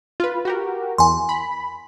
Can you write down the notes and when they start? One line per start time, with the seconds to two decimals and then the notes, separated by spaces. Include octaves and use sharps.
0.20 F4 B4
0.45 F#4 G4 A#4
0.98 E2 G#5 C6
1.29 B5